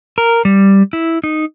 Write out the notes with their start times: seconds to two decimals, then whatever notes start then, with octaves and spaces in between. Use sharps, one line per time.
0.18 A#4
0.45 G3
0.93 E4
1.24 D#4